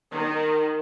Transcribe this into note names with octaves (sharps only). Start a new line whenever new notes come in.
D#3